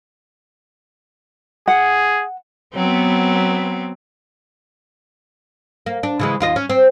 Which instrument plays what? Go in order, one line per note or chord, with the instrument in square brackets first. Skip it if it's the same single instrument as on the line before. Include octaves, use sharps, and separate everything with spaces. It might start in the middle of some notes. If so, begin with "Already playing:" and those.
[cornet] G#4 [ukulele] F#5
[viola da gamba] F#3 C4 [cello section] B3
[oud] A#3
D4
C#3 E3 G#3
D#2 F4 D#5
C#4
C4